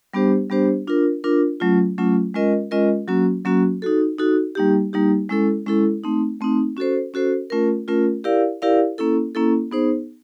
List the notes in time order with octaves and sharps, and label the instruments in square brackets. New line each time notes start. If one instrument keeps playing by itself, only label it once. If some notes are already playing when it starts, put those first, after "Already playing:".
[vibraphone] G3 B3 D4 G4 C5
G3 B3 D4 G4 C5
D4 F4 A#4
D4 F4 A#4
F#3 A3 C#4 F4
F#3 A3 C#4 F4
G#3 C#4 F4 A#4 D#5
G#3 C#4 F4 A#4 D#5
F#3 A#3 C#4 F#4
F#3 A#3 C#4 F#4
D#4 F#4 A4
D#4 F#4 A4
G3 A#3 D#4 G4
G3 A#3 D#4 G4
G#3 C#4 E4 A4
G#3 C#4 E4 A4
A3 C4 D#4
A3 C4 D#4
C#4 F#4 A4 C5
C#4 F#4 A4 C5
A3 C#4 F4 A#4
A3 C#4 F4 A#4
E4 G4 A#4 D5 F5
E4 G4 A#4 D5 F5
A#3 C#4 E4 A4
A#3 C#4 E4 A4
B3 D#4 G#4 C5